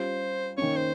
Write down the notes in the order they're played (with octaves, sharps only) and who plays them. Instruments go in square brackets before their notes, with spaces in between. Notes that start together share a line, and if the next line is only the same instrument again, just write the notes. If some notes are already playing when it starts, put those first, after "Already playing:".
Already playing: [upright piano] G3 C#4 F4 [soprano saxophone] C5
[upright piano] D#3 A#3 C#4 [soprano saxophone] C#5
[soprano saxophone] C5